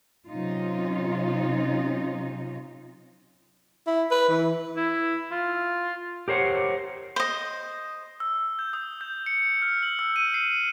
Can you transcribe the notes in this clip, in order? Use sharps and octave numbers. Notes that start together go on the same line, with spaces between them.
C3 F#3 C#4 D#4 F4
E4
B4
E3
E4
F4
G4 A#4 C5 C#5 F#5
C5 D#5
E6
G6
D#6
G6
C#7
F6
F#7
E6
D#7
C7